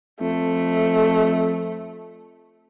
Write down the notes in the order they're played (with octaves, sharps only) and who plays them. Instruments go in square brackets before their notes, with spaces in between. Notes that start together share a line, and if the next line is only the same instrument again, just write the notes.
[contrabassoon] F2 [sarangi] A3